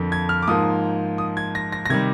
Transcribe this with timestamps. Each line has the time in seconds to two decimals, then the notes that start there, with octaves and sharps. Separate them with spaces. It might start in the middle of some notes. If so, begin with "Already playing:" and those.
Already playing: F2 D3 F3 A#3
0.12 G#6
0.29 F6
0.42 D6
0.47 G#2 F3 A#3 D#4 D#6
1.18 D#6
1.37 G#6
1.55 A#6
1.72 A#6
1.86 A#6
1.90 C3 D#3 G3 G#6